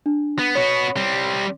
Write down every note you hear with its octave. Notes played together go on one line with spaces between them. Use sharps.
D4
B3
B3 F#4 C#5
G3 C4